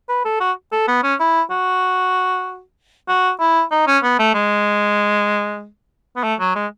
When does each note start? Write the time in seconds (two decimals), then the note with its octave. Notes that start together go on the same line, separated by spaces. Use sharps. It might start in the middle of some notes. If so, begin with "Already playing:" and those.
0.09 B4
0.25 A4
0.41 F#4
0.72 A4
0.88 B3
1.04 C#4
1.20 E4
1.51 F#4
3.09 F#4
3.40 E4
3.72 D#4
3.87 C#4
4.04 B3
4.19 A3
4.34 G#3
6.16 B3
6.24 A3
6.40 F#3
6.55 G#3